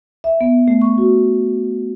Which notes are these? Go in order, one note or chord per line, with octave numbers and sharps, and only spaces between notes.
E5
B3
A3
C#6
F#4